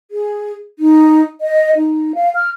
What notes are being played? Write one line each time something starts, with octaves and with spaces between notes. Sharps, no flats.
G#4
D#4
D#5
D#4
F5
F6